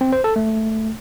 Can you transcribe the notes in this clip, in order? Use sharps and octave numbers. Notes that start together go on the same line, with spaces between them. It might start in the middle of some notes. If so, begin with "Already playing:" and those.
C4
C5
A4
A3